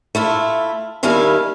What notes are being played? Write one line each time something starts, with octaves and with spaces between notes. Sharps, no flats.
A3 E4 F4
D#2 D#3 G3 E4 F5 G#5